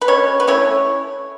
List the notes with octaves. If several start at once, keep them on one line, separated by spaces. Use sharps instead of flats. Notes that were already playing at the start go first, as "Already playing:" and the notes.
B4
B2 C#4 C#5
B4
A3 C#4 E4 C#5